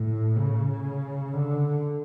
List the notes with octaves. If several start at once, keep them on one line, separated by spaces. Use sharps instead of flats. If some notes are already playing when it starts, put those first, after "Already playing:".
Already playing: A2
C#3
D3